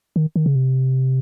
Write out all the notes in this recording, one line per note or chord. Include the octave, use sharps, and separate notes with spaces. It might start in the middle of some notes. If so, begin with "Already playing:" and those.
D#3
D#3
C#3
C3